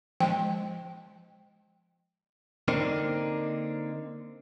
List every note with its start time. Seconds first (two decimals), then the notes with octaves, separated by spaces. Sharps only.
0.20 F3 G#3 G5
2.68 D3 A#3 C4 D4 D#4